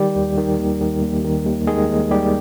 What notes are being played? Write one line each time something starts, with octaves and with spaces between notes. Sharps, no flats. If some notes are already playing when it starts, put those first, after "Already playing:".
Already playing: D#3 G3 G4
D#2
D#3
D#2
D#3
D#2
D#3
D#2
D#3 G#3 G#4
D#2
D#3 G3 G4